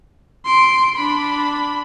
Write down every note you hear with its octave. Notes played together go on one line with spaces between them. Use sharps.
C6 D7
D4 B5